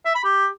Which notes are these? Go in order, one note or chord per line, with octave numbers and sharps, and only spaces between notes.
E5
B5
G4